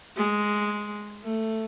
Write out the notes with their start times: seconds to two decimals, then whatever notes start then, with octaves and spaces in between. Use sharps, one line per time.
0.16 G#3
1.24 A3